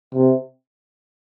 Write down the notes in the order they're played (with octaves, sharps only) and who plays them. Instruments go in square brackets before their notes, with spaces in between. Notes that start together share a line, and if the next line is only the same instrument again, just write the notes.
[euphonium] C3